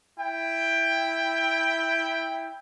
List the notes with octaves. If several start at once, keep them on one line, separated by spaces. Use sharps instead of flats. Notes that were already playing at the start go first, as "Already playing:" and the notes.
E4 G5